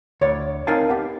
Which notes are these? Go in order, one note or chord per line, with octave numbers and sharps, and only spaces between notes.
D2 C#5 D5
C4 D#4 A#4 F5 G#5 A5
B3 G4